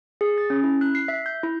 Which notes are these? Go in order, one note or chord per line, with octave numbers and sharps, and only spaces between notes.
G#4
A6
C#4
E4
F#6
C7
E5
G6
E4